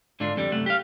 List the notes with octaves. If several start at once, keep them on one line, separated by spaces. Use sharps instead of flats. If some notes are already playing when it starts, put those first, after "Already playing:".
G#2 D3 D4 F4
F2 D3 G3
C2 F#2 A3 F#5
G4 F5